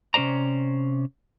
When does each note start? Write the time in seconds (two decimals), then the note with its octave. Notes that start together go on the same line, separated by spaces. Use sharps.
0.14 C3 C#4 A4 C5 D5 A#5